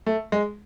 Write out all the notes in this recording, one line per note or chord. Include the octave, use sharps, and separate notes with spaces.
A3
G#3